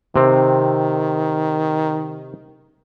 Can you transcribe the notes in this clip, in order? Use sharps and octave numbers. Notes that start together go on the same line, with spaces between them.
C3 D#3 C4